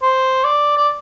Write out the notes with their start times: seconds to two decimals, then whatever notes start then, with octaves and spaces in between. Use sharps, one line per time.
0.02 C5
0.44 D5
0.77 D5